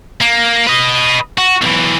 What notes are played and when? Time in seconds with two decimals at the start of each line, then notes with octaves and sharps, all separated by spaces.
0.21 A#3
0.67 B4 D#5
1.38 F#4
1.61 B1 E3